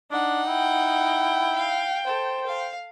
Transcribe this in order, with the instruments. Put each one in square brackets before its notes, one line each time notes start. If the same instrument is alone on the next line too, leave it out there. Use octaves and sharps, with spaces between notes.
[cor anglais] D4 [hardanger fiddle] D#4 F#5
[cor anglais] E4 [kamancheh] G5
[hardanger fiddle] F5
[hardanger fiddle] A4 [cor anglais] C5
[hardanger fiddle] F5